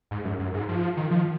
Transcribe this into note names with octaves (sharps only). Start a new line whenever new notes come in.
G#2
F#2
F#2
G#2
F3
D#3
F3